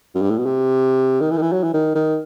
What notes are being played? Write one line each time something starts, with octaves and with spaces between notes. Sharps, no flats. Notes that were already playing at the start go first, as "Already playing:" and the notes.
F#2
G2
A2
B2
C3
D#3
E3
D#3
E3
F#3
E3
D#3
D#3